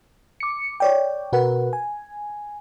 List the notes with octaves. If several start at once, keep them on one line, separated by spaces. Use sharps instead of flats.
D6 C#7
C#5 D5 G5
B2 F#4 A#4 B4 F#5
G#5